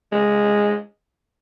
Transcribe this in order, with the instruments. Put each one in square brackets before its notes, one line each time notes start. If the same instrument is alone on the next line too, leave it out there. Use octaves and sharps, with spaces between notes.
[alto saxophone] G#3